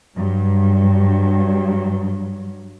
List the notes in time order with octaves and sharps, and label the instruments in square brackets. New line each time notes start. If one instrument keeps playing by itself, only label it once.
[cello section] G2 F#3